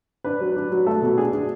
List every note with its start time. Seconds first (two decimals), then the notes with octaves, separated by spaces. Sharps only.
0.24 D4 B4
0.41 F#3
0.56 D4
0.72 F#3
0.87 A3 A4
1.02 B2
1.17 D4 G#4
1.32 D4